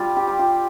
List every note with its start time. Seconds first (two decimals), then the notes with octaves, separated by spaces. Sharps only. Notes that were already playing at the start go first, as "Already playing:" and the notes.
Already playing: G3 F4
0.16 G4
0.27 G3
0.39 F4